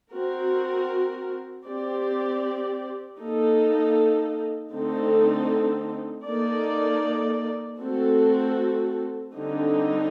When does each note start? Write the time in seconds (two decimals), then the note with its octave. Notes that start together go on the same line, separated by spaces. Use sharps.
0.12 C4 F#4 A#4
1.65 C4 G4 D5
3.18 A#3 D#4 A4
4.72 D3 A3 C4 D#4 A4
6.26 A#3 D#4 A4 D5
7.80 A3 C4 F#4 A4
9.33 D3 G3 C4 D#4